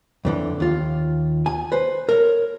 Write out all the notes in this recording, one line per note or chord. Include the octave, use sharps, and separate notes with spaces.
F2 D3 E3
D#2 F4
G#5
B4 C5
A#4 C#5